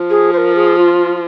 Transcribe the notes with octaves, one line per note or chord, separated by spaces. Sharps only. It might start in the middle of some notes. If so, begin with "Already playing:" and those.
Already playing: F3
G#4
C5
A#4
G#4
F4